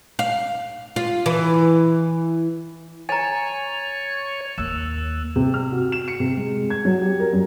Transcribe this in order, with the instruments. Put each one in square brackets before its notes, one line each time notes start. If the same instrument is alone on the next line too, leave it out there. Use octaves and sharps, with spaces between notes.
[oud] F5
F4
E3
[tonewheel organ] C#5 [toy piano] G#5 A#5 [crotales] A6 D#7 F7
[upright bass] D#2 A#3 [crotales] E6 F#6 E7
[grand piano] C3
F6
F#4
E7
C#7
C3
G#3
G#6
F#3
G4
A#4
F#2